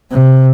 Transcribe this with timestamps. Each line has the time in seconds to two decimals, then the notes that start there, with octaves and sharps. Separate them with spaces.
0.11 C3